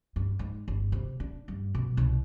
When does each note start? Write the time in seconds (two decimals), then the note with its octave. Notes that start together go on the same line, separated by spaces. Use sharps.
0.16 G2
0.39 G#2
0.68 G1
0.92 C3
1.20 D4
1.48 G2
1.75 B2
1.97 C2